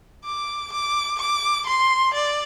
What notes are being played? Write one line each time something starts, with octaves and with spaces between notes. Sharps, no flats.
D6
D6
D6
C6
D5